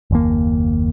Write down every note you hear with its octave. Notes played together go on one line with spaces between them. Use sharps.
F#1 D#2 A#3